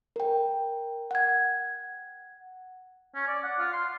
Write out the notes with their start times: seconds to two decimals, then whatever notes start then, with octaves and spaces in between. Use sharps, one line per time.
0.16 A#4 G5
1.11 F#5 G#6
3.15 C#4
3.27 D5
3.43 F#5
3.59 F4
3.73 C6